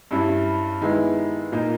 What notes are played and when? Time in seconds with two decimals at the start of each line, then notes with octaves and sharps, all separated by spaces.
0.11 G2 G3 C#4 E4
0.81 D#3 G#3 B3 E4
1.52 A#2 A#3 D#4